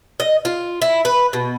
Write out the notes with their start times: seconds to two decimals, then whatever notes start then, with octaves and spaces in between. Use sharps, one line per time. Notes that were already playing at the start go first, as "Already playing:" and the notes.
0.20 D#5
0.45 F4
0.82 E4
1.05 B4
1.33 B2